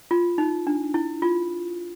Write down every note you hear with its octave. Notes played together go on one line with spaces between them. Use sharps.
F4
D#4
D4
E4
F4